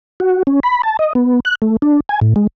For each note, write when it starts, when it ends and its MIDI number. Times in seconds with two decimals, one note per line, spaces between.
0.20 0.43 66
0.47 0.60 61
0.63 0.82 83
0.83 0.97 81
0.99 1.13 75
1.15 1.40 59
1.45 1.55 90
1.62 1.77 57
1.82 2.00 62
2.09 2.20 80
2.21 2.34 45
2.36 2.47 56